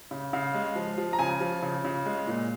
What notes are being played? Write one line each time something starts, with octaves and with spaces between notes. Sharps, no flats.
C#3
C#3 F5
G#3
F3
F3
A#5
C#3 G#5
F3
C#3
C#3
G#3
A#2